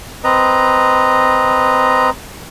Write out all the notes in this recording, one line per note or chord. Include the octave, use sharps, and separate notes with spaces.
C4 B4 D#5 A#5